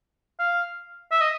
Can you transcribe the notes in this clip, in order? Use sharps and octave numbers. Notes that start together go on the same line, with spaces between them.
F5
E5
D#5